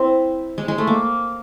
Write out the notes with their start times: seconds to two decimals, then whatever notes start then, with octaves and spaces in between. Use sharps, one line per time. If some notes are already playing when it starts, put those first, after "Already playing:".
Already playing: C4 E4
0.58 G#3
0.68 G#3
0.78 A3
0.87 A#3